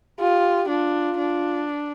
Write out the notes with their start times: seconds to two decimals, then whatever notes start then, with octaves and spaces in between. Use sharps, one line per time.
0.19 F4 G4
0.68 D4 F4
1.17 D4